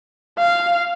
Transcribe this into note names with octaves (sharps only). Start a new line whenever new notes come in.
F5